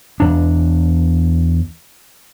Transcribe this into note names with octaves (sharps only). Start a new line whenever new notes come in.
E2 D4